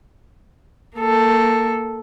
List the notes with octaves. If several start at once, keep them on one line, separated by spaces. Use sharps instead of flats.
A#3 A4